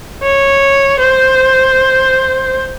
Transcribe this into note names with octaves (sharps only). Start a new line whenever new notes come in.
C#5
C5